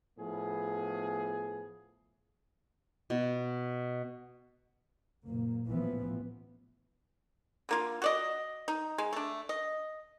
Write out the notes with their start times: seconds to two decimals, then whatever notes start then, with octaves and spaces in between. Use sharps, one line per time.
0.18 A2 F3 B3 G#4
3.10 B2
5.27 F#1 A#2 A#3
5.67 A1 E3 F3 B3
7.69 D3 A#3 F4
8.02 F#4 D5 D#5
8.68 D#4
8.98 G#3
9.13 A3 D4
9.49 D#5